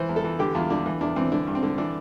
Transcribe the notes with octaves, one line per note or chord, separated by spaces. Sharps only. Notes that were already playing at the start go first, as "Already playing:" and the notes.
Already playing: E3 C5
E2
A4
E3
D3 G4
E2 F4
D3 D4
E3
E2 D4
E3 C4
D3 D4
G2
C4
D3
E3 D4